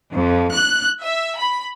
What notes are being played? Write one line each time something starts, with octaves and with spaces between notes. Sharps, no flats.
F2
F#6
E5
B5